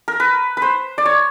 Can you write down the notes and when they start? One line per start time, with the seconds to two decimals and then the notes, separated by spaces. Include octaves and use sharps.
0.08 A#4
0.20 B4
0.57 B4 C5
0.98 D5
1.06 C#5